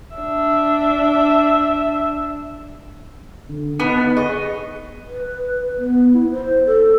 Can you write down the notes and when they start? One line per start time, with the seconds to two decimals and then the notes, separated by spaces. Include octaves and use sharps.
0.15 D4 E5
3.49 D3
3.80 B3 D#4 F#5 A5
4.17 G#4 D#5 C#6
5.08 B4
5.78 B3
6.13 E4
6.31 C5
6.66 A4